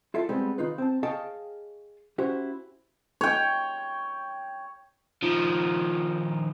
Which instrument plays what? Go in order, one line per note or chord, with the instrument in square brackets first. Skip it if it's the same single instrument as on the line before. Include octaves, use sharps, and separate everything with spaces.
[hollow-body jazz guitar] E4 F4 A4 E5
G3 G#3 B3 C4
D#3 D#4 F4 B4
C4 A5
G#4 C#5 D#5 F5 G5 A5
C#4 E4 F#4 G4 C5
[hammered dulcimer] C#5 G5
[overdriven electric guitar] D#3 F3